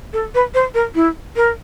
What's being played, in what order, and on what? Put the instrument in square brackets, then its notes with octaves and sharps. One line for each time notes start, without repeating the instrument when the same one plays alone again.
[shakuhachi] A4
B4
C5
A#4
E4
A#4